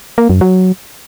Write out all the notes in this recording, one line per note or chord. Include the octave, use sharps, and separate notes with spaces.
A#3
F#2
F#3